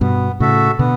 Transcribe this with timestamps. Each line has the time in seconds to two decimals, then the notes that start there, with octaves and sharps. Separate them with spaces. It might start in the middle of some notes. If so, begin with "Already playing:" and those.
0.01 G2 B2 B3
0.40 A2 C#3 F#4 A4 E5
0.79 B2 D3 B3